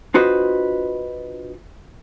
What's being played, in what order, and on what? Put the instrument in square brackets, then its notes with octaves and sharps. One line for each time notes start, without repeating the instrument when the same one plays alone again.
[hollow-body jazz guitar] D4 F4 F#4 B4 C5 D#5